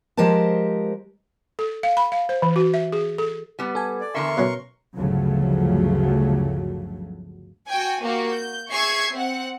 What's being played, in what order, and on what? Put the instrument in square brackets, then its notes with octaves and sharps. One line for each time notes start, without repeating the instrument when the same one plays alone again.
[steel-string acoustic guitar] F3 G#3 G4 A#4 C5 A5
[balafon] A4
F5
B5
F5
C5
E3
F#4
E5
G#4
A4
[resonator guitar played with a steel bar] G3 B3
[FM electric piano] A4 G#5
[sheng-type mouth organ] D5
[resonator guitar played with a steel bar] E2 D3 E5 [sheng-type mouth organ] A#4 C6 C#6
[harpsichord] B2 F#3 C#4
[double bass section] G1 D2 C#3 F3 F#3 A3
[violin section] F#4 G5 G#5
A#3 F#4 G4
G6
G#4 E5 C#6 G#6 C7
C4 F#5